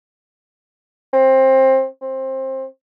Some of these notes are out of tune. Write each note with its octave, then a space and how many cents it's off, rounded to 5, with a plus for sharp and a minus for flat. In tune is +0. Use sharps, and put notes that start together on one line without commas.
C4 +20
C4 +20